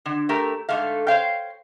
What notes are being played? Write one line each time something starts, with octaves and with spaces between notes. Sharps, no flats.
D3
A3 G4 A#4
G#2 D3 A3 F5
C5 C#5 F5 G5